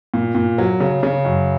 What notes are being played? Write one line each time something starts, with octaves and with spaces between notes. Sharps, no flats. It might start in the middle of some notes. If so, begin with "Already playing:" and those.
A#2
A#2
F#3
C#3
C#3
F#2